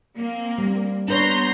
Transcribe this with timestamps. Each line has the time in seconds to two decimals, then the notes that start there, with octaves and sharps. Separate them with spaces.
0.17 A#3 C4
0.58 G3
1.08 B3 D4 B4 C#5 A#5 C6 G6